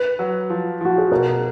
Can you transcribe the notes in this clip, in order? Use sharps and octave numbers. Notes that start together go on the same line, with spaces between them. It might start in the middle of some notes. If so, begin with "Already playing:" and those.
Already playing: B4
F#3
F3
F3 F#4
G#4
B2 A#4